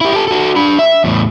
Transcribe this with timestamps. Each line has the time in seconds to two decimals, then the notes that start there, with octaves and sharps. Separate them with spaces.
0.01 E4 G4
0.13 G4 A4
0.28 F#4 A4
0.56 D4 B5
0.79 E5
1.04 E2 A2